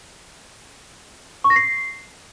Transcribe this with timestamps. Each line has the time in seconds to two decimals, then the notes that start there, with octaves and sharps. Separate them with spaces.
1.44 C#6
1.50 A#6
1.56 C7